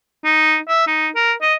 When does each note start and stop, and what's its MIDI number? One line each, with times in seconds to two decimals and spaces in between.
0.25 0.58 63
0.68 0.86 76
0.87 1.09 63
1.15 1.33 70
1.42 1.54 75